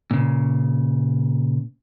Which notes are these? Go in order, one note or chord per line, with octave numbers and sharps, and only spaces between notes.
A#2 C#3